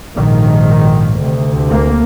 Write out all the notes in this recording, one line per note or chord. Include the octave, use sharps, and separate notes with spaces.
A#1 G#2 D#3
D2 C3
A#3